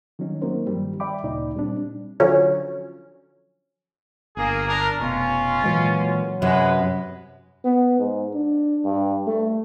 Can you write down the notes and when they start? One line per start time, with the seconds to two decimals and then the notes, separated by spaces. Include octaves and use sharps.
0.19 D#3 F#3 G3 C#4 D#4
0.42 F#3 A#3 C4 D#4 A#4 C5
0.67 G2 D#3 F3 G3
1.00 D5 E5 G5 B5 D6
1.23 D2 A#2 C#3 D#4 D5
1.55 A#2 G3 C4 D4
2.20 D3 F3 F#3 C#4
4.37 G1 A#3 G#4
4.68 D4 A#4
5.00 F1 B2 C#4 F4
5.64 A#2 E3 F#3 G#3
6.42 F#2 C3 G#3 B4
7.65 B3
7.99 G#2
8.34 D4
8.85 G2
9.27 A3